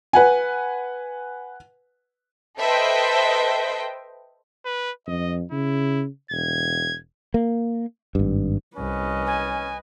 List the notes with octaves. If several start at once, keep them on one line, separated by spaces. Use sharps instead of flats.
B4 F#5 G#5
A4 B4 C5 D#5 E5 G5
B4
F2 D#5
C#3 E4
E1 G#6
A#3
G#1 G2
C2 C#4 B4 D#5
G#5